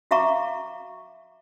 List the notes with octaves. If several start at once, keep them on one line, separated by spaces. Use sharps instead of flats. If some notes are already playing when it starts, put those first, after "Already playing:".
F#4 E5 F5 A#5 C#6 D6